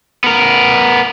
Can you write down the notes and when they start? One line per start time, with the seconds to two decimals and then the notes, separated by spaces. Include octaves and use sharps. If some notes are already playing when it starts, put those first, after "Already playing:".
0.24 B3 A#4